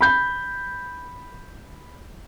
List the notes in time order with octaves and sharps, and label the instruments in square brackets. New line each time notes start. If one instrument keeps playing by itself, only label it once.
[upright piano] B5 G6